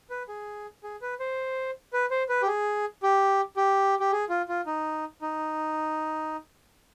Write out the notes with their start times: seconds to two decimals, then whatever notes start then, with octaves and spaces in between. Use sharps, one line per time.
0.10 B4
0.28 G#4
0.84 G#4
1.02 B4
1.20 C5
1.93 B4
2.11 C5
2.29 B4
2.42 G4
2.47 G#4
3.03 G4
3.57 G4
4.00 G4
4.12 G#4
4.29 F4
4.48 F4
4.66 D#4
5.22 D#4